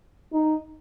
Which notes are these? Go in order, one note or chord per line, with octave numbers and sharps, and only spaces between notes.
D#4